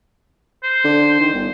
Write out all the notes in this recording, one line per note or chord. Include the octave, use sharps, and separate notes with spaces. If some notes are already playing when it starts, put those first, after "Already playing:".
C5
D3
D#3
G1